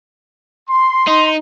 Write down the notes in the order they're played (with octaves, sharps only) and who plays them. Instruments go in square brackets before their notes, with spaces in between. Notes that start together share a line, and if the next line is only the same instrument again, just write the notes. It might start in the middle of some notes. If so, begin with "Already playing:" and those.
[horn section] C6
[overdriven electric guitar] D#4